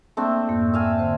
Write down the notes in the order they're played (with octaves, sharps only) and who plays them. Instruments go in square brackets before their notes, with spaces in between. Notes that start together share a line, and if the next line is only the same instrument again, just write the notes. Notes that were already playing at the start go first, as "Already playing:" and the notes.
[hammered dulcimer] A3 C4 D4 [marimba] A#3
[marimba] F2 G#2 A#3
[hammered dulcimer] E5 F5 G#5
[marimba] D3 C5